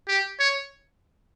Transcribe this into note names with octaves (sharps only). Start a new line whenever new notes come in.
G4
C#5